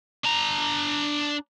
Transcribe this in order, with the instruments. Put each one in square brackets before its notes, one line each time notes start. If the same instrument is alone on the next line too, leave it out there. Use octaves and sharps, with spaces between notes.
[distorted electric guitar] D4 A#5